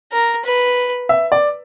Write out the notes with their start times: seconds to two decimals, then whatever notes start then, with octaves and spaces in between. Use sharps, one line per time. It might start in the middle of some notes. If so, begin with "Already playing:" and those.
0.12 A#4
0.45 B4
1.09 E5
1.32 D5